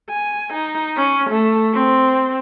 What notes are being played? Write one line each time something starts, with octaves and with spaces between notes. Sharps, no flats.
G#5
D#4
C#4
A3
C4